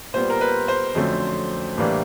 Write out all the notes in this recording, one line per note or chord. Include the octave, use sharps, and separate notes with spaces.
A#2 G3 B3 C5
A#4
B4
C5
F2 D3 F#3 A3 C#4
A2 E3 G3 A#3 D4